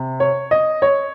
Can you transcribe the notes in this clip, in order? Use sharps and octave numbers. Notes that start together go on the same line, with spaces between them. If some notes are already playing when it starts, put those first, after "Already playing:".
Already playing: C3
C#5
D#5
C#5